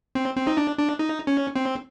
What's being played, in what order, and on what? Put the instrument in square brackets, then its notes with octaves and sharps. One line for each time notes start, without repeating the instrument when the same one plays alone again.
[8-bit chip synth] C4
C4
D#4
D4
D4
D#4
C#4
C4